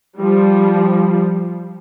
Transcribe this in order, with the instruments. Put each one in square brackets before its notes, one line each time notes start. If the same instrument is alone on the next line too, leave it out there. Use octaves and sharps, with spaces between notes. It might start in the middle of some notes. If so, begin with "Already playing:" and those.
[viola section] F3 G3